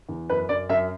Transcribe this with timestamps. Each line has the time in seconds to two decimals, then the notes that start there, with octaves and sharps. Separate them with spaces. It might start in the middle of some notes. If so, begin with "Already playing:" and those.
0.09 E2
0.29 F#2 B4
0.49 F#2 D5
0.69 F#2 E5